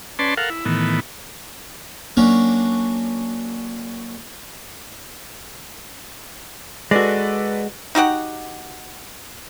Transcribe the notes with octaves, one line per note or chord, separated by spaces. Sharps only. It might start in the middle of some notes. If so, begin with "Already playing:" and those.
C#4 B4 D5 A5 C6
A4 A#4 F5 F#5
E4
A2 D#3 E3 B3
F#3 A#3 C#4 D4
G#3 F#4 A4 B4 D5
D#4 F#4 G4 F#5